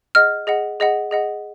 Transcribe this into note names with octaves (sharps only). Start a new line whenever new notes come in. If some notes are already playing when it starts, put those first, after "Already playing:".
G#4 D#5 F#5 F6
G#4 D#5 F#5
G#4 D#5 F#5
G#4 D#5 F#5